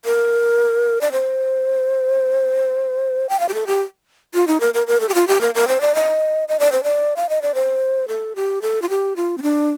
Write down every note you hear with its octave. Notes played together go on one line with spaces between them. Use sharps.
A#4
D5
C5
G5
F5
G4
A4
G4
F4
D#4
A#4
A#4
A#4
A4
G4
F4
G4
A#4
A#4
C5
D5
D#5
D#5
D5
C5
D5
F5
D#5
D5
C5
A4
G4
A4
F4
G4
F4
C4
D4